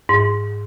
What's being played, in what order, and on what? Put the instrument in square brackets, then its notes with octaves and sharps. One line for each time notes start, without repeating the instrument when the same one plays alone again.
[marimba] G#2